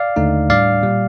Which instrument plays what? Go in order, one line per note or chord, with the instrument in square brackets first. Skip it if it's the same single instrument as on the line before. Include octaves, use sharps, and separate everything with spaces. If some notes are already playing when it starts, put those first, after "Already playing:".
Already playing: [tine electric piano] D5 F5
D#2 D3 A3 D#4
A2 G3 D4 D5 F5
A#2 G3